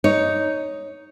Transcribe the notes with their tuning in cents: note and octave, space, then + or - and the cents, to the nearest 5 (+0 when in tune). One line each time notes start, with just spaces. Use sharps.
D#4 +0 C#5 +5